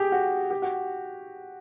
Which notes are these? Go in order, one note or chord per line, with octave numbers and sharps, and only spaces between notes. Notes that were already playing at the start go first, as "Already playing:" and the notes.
Already playing: G4 G#4
F#4
G4
F#4